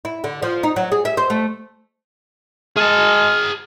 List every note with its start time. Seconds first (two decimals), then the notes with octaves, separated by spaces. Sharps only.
0.05 E4
0.24 D3
0.42 F3
0.63 D#4
0.76 F#3
0.92 G#4
1.05 E5
1.17 C5
1.30 A3
2.77 G#3 G#4 A5 F6